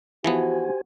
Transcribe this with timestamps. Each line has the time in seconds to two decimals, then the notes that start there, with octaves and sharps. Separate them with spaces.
0.24 E3 F3 B3 F#4 G4 C5 G#5